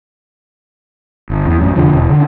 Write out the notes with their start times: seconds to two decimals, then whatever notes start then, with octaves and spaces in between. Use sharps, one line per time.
1.30 G1
1.46 E2
1.60 A1 F#2
1.75 F1 C2 D3 F3
1.93 E1
2.09 D3 D#3